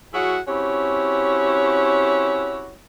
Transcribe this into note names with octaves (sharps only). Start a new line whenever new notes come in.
F#3 E4 F#4 G#4 C#5
C4 C#4 E4 F#4 G4 C#5